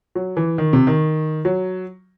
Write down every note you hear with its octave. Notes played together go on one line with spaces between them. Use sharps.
F#3
E3
D#3
C3
D#3
F#3